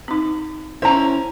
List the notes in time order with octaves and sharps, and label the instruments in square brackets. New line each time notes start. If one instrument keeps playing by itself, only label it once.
[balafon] C4 D#4
[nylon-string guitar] C#4 E4 E5 [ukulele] C5 A#5